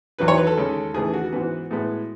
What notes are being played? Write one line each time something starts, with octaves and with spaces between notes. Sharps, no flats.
E2 D#3 F#3 B4
C#5
B4
A4
D#2 C#3 G#3 C#4
D#2 C#3 E3 A3 G#4
F#4
G#2 E3 B3 F#4
A2 G#3 B3